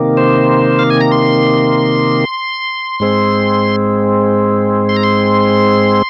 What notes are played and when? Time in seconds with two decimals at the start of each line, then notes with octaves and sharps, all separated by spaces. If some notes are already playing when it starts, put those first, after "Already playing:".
Already playing: C3 D#3 A#3
0.17 C5
0.79 F5
0.90 G#5
1.01 A#5
1.12 C6
3.00 G#2 G#3 C4
4.89 C6
4.96 A#5
5.03 C6